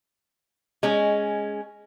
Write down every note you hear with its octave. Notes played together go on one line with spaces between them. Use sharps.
G#3 C#4